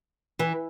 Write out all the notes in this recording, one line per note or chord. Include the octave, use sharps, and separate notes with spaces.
E3